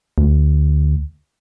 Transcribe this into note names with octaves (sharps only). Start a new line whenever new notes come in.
D2